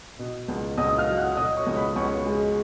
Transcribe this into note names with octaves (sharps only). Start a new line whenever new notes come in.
B2
C#2
C#2 D#5 D#6
D#6
F5 F6
F#3
F#5 F#6
B2 D#5 D#6
C#5 C#6
C#2
B4 B5
C#2 C#5 C#6
G#3